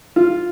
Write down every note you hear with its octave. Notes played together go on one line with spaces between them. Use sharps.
F4